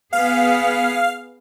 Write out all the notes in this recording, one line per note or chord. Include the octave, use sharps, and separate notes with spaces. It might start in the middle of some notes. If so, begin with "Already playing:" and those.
B3 G#4 F5